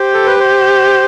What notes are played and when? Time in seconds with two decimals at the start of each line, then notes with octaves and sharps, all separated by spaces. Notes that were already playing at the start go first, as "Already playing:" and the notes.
Already playing: G4 C5
0.14 A4
0.26 B4
0.40 C5